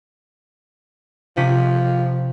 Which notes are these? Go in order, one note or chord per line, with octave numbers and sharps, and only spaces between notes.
C3 F3 C#4 B6